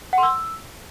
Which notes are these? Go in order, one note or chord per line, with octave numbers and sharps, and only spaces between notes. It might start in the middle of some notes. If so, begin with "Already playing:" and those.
F#5
C6
E6